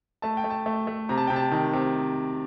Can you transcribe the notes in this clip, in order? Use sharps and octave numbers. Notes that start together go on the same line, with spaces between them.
A3 A5
G5
A3
A5
A3
A3
C3 A#5
A5
C3 G5
A5
D#3
C3